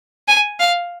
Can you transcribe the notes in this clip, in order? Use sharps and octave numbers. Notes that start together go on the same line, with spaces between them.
G#5
F5